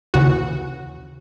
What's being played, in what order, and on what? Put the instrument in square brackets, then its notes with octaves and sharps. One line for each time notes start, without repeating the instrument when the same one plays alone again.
[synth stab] D#2 C#3 E3 F#4